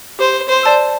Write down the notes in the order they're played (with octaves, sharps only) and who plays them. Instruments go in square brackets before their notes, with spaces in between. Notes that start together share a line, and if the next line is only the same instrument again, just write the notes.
[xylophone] G4 [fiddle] C5
[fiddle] C5
[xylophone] D5 A5 E6